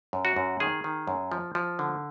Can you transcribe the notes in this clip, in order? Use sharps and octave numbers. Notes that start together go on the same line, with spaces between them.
F#2
F#4
F#2
D#3 G#4
D#3
F#2
F3
F3
D3